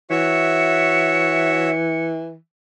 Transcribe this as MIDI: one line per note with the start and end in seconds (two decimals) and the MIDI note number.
0.10 2.36 52
0.10 1.70 66
0.10 1.70 73
0.10 1.70 76
0.10 2.05 97